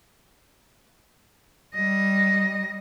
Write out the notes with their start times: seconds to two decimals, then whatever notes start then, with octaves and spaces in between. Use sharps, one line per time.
1.74 G3 D#5